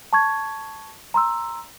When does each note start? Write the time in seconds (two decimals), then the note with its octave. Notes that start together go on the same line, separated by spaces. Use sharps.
0.13 A5 C#6 G#6
1.14 A#5 C6 E6